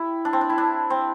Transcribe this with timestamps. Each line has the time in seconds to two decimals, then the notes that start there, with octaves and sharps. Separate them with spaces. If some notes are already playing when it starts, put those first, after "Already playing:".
Already playing: E4 G4
0.25 D4
0.33 C4
0.41 D4
0.49 E4
0.58 D4
0.90 C4